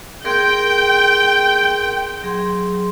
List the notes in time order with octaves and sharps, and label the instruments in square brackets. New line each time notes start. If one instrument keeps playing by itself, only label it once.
[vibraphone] G#4 A#4 C6 [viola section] G5
[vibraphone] F#3 G#4 C6